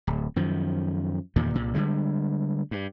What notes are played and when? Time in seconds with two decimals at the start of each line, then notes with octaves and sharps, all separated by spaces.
0.07 D1
0.36 F#2 D#3 F3
1.36 E2 G2 A#2 D#3
1.54 C2 A#2
1.75 D3 G3 G#3
2.71 G2